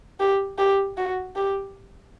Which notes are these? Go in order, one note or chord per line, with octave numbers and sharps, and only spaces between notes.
G4
G4
F#4
G4